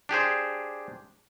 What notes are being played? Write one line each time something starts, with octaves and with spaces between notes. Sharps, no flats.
D4 G4 G#4 C5